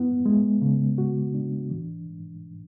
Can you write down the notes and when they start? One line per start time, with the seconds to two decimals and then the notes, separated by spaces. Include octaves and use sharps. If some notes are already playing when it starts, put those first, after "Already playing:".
Already playing: F#2 E3 B3 E4
0.26 G#3
0.62 C#3
0.98 F#4
1.34 D4
1.70 E3